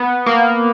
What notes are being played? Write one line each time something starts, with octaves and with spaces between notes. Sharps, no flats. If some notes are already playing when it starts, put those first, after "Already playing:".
Already playing: B3
A#3